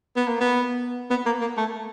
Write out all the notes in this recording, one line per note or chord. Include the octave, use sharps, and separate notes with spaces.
B3
A#3
B3
B3
A#3
A#3
A3